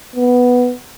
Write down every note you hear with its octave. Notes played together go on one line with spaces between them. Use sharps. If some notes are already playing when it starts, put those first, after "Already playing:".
B3